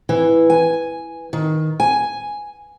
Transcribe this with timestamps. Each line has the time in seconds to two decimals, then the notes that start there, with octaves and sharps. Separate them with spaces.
0.09 E3
0.50 G#5
1.33 D#3
1.80 G#5